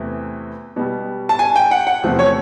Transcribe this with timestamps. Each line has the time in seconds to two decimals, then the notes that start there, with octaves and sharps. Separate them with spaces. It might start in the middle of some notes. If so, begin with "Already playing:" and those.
Already playing: E2 C3 E3 A3
0.76 B2 G3
1.29 A5
1.39 G#5
1.56 G5
1.71 F#5
1.87 F#5
2.03 E2 C3 F3 A3
2.19 C#5